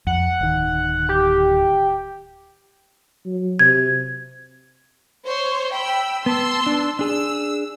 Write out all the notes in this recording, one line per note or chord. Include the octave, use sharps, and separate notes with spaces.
F2 F#5
D1 D#3
G4
F#3
C3 G#6
C5 C#5
G5 B5 E6
B3 A5 C6 E6
D4
D4 G#4 E6